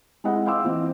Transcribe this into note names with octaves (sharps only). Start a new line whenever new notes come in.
G#3 C4 E4 D#5 F#5
D#5 F5 G5 C6 D6 E6
E3 C4